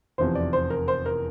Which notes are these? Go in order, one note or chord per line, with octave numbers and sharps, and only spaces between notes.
F1 E2 C3 F3 C5
D5
C5
A#4
C5
A#4